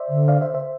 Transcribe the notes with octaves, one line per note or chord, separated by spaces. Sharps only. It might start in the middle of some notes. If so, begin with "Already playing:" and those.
Already playing: C5 D5 E5
D3
D5 F5
C5 E5
C5 E5